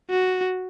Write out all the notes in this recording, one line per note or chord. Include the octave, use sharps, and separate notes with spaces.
F#4